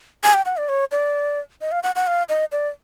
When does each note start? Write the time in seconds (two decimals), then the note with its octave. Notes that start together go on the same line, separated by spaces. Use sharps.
0.23 G#5
0.34 G5
0.46 F#5
0.57 D5
0.69 C#5
0.92 D5
1.61 D#5
1.72 F5
1.83 F#5
1.96 F#5
2.07 F5
2.29 D#5
2.52 D5